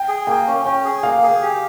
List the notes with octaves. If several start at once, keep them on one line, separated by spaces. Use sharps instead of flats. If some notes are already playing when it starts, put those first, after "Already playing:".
Already playing: G5
G#4
A#3 G5
C#4
C#4 G5
G#4
A#3 F5
G#4
G4